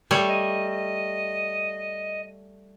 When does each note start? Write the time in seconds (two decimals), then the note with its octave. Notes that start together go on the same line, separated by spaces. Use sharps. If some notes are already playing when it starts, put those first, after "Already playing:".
0.11 G3 A3 C#5
0.28 D#5